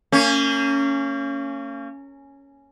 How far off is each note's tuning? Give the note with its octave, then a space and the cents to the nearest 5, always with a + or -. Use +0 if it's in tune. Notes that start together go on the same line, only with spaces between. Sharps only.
A#3 -35 C#4 +0